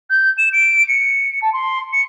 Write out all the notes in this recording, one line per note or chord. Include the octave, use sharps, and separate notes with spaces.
G6
E7
D7
C#7
A5
C6
C#7